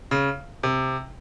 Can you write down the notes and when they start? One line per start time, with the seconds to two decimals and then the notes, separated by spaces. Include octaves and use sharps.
0.11 C#3
0.63 C3